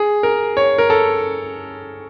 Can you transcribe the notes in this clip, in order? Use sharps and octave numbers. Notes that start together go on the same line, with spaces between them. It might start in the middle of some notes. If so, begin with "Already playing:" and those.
Already playing: G#4
A#4
C#5
A#4
A4